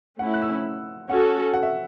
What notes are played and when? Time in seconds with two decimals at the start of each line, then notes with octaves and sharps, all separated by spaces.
0.19 A3 C#4 E4 F#5
0.34 F#6
0.42 E6
1.09 C#4 F#4 A4 F#5
1.53 F#5
1.63 E5